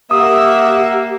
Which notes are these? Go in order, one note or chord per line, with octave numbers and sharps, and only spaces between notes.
A#3 G4 E5 F#5 D#6